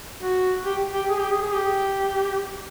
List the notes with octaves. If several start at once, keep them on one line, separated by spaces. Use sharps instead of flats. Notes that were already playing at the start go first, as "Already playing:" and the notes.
F#4
G4
G4
G#4
G4
G#4
G#4
G4